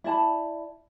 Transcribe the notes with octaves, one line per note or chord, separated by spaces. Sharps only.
E4 D5 A5 B5